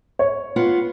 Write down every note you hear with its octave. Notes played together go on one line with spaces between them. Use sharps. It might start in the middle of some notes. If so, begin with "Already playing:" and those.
C#5
B3 F4 F#5